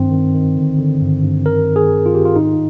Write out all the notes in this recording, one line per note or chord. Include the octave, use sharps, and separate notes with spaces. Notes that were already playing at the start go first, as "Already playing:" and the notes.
Already playing: G2 D#3 C4
D#3
D#3
D3
D3
G2
G2
D#3 A#4
D#3
G#4
D#3
F4
D#3 G4
F4
G#2 D#4